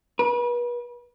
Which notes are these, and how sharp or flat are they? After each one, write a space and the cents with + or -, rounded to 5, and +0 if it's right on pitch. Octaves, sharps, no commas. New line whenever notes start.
B4 -35